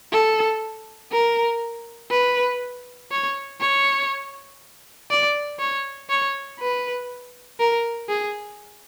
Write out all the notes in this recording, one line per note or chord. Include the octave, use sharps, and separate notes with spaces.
A4
A#4
B4
C#5
C#5
D5
C#5
C#5
B4
A#4
G#4